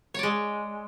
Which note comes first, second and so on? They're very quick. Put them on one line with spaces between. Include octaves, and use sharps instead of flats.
C#5 D5 G#3